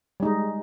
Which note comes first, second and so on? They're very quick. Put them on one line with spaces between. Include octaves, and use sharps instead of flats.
G3 D#4 G#3